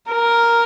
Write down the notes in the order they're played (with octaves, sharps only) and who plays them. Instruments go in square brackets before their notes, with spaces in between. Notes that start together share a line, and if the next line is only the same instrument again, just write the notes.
[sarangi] A#4